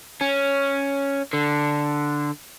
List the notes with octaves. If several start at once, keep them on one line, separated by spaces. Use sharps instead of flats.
C#4
D3